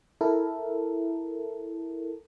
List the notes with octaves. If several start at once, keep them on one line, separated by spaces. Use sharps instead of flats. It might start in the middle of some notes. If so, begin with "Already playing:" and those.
E4 A4 A#4